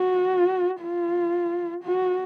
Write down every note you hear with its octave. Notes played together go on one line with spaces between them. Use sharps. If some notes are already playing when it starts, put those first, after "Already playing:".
Already playing: F#4
F4
F#4